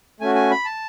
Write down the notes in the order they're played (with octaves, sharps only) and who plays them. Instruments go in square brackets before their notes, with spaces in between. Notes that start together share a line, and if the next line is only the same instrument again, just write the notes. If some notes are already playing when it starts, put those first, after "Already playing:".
[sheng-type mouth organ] A3 C#4 F#4 G#5
G#5
B5
A5